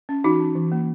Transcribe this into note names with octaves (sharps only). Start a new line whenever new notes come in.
C#4
E3 D#4 F#4
C#4
E3
A#3